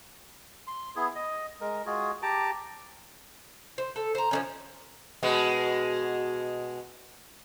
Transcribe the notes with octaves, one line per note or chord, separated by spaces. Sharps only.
C6
B3 E4 G#4
D#5
G#3 A#4
G#3 F4 F#4 G#4
G4 A5 A#5 D6
C5
A4
C5 A#5
F3 G3 C#4
B2 G#3